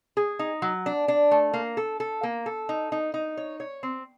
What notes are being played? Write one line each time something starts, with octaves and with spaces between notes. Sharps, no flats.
G#4
D#4
F#3
D4
D4
A3
A#3
A4
A4
A#3
A4
D#4
D#4
D#4
C#5
C#5
C4